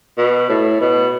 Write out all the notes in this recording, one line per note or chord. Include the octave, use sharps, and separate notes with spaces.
B2
A2
B2